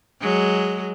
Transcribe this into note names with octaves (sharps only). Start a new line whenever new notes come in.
F#3 G#3